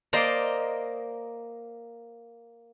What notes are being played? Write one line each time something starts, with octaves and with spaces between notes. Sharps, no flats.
A#3 C5 D5 D#5